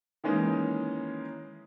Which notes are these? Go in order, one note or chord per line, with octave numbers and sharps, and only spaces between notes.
D#3 E3 G#3 A#3 C#4 D#4